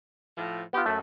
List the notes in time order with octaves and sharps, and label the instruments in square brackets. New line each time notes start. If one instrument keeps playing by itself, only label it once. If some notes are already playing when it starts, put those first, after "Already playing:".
[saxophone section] A2 F3
[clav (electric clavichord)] B3 F4 [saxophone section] G4
[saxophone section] F#2 [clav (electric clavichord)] A3 A5